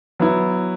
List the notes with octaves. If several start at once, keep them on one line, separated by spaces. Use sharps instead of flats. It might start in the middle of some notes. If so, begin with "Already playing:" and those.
F#3 B3 E4